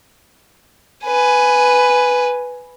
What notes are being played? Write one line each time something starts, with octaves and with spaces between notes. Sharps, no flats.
B4 G#5